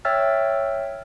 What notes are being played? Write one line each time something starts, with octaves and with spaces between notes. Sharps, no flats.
C#5 E5 G5 E6 F6 A6